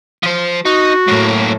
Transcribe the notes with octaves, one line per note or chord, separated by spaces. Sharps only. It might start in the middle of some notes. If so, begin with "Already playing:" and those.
F3 C5
D#4 F#4
F#2 A2 A#3